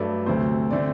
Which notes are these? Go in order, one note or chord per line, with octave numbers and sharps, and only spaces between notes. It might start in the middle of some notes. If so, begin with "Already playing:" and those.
Already playing: G2 F#3 A3 D5
D2 C3 F#3 A3 C5
D3 A3 C4 D5